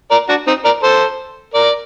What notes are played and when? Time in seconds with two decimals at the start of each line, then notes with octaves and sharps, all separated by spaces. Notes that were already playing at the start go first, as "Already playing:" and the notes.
0.11 A#4 D5
0.29 D4 F#4
0.47 C4 D#4
0.65 A#4 D5
0.83 A4 C5
1.54 A#4 D5